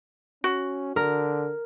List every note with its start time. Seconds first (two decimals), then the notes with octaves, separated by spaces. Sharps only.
0.44 C#4 F#4
0.96 D3 A#4